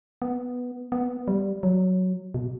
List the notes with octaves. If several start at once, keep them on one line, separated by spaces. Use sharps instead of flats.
B3
B3
G3
F#3
B2